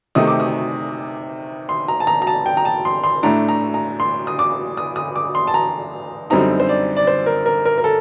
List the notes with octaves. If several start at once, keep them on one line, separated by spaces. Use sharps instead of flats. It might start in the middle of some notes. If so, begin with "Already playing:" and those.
C3 D#3 A3 D#4 D#6
D6
D#6
C6
A#5
A5
A#5
A#5
A5
G5
A#5
A5
C6
C6
A2 A3 D4 A#5
A#5
A#5
C6
D#6
D6
D#6
D#6
D6
C6
A5
A#5
F#2 D3 G3 C4 D#4 A#5
C5
D5
D5
C5
A#4
A#4
A#4
A#4
A4